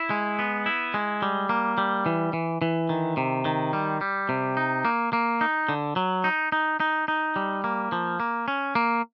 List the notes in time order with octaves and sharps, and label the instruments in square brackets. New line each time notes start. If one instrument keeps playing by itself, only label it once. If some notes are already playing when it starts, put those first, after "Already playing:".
Already playing: [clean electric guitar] E4
G#3
B3
E4
G#3
G3
A#3
G3
E3
E3
E3
D#3
C3
D#3
G3
G3
C3
D#4
A#3
A#3
D#4
D3
F#3
D#4
D#4
D#4
D#4
G3
A#3
F3
A#3
C#4
A#3